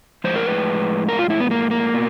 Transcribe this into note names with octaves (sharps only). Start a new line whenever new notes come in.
A2 F3 G#3 C5
A#4
B4
A#4
F4
E4
B3
A#3
A#3
B2